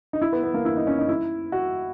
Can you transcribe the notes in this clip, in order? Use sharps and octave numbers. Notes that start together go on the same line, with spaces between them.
D#4
E4
B3
B3
A#3
E4
D#4
C#4
D#4
E4
F#4